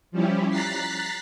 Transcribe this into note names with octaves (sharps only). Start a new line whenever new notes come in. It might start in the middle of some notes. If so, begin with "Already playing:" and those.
F3 G3 C#4 E4 G4
A#5 F#6 A6 B6 C7